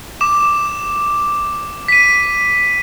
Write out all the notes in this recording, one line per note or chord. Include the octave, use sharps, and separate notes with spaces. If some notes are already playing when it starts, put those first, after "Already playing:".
D6 E7
B6 D#7